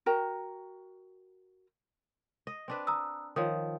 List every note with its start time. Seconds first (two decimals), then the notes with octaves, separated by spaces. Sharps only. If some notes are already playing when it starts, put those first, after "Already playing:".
0.06 F#4 A#4 G5 A#5
2.47 D#5
2.68 C4 D4 B4
2.87 A#5 D#6 E6
3.36 D#3 F3 C#5 D#6